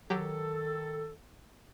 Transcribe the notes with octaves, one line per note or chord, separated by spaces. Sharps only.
D#3 F#3 G4 A4